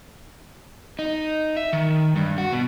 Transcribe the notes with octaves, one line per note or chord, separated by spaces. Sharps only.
D#4
E5
D#3
G2
F#4
B2